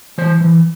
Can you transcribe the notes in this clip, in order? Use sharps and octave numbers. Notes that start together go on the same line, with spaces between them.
E3 C5
E3